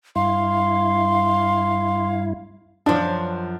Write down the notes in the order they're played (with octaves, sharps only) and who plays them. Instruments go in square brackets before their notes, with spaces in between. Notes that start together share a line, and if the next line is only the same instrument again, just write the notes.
[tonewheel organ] G2 E4 [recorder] F5 [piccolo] C6
[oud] F#2 F3 [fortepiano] D4